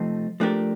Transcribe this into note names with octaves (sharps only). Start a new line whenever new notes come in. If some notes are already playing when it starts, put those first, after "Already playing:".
Already playing: C3 F3 A3 C4 D#4
F3 A3 D4 G4 A#4